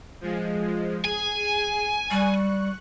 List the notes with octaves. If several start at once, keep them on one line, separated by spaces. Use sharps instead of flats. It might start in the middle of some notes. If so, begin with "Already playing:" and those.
F3 G#3
G#4 G#5
G3 C#6 F#6